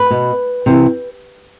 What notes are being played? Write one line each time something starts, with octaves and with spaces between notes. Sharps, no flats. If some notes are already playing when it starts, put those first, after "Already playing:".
Already playing: B4
B2
C3 E3